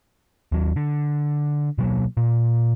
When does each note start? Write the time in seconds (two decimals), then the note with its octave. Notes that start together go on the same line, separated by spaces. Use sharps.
0.52 D#2 F#3
0.76 D3
1.78 B2 F#3 A#3
2.17 A#2